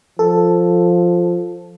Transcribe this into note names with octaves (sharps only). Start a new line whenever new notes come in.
F3 A4